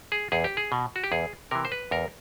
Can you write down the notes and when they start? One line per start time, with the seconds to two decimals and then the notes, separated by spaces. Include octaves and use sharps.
0.12 G#4
0.32 E2 G#4
0.44 G4
0.57 G#4
0.72 B2
0.96 F#4
1.04 G4
1.12 E2 G#4
1.51 C3 E3 A#4
1.65 C5
1.72 B4
1.91 E2 A#4